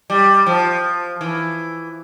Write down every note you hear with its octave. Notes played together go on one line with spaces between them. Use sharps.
G3
F3
E3